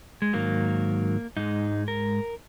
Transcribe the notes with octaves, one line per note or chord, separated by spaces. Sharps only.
G#3
G#2 D#3 F#3 A#3
G#2 G#3 D#4
A#4